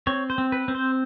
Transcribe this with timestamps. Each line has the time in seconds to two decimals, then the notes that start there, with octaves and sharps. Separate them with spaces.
0.07 C4 C#5
0.30 C5
0.38 C4
0.52 B4
0.68 C4
0.75 C5